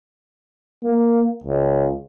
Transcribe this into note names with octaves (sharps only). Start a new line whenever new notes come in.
A#3
C#2